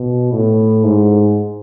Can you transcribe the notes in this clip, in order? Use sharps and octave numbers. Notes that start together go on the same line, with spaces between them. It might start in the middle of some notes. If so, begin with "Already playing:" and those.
Already playing: B2
A2
G#2